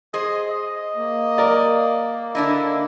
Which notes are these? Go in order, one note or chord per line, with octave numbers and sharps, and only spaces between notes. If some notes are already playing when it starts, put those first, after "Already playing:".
G#4 C5 D#5
D#5
A#3
A#4 D5
D3 D4 E4 D#5